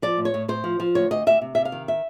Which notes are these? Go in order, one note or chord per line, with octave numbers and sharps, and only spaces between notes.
F3 D5
A2
C#5
A2
A2 C5
F3
F3
D2 C#5
D2 D#5
D2 E5
C3
C3 E5
F5
D#3
E5